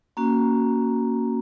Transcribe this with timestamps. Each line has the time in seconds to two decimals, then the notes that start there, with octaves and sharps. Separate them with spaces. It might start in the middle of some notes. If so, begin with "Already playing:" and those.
0.17 A#3 C#4 F#4